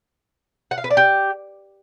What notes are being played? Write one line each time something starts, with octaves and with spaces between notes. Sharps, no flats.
F#5
F5
B4
D5
G4